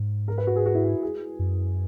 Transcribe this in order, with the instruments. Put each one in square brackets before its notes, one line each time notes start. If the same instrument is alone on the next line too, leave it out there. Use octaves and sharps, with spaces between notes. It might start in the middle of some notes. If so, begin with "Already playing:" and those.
Already playing: [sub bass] G#2
[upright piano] A#4
B4
F#4
G#4
F#4
E4
F#4
G#4
[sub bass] F#2